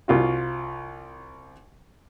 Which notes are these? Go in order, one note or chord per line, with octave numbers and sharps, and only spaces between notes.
C2 F4 F#4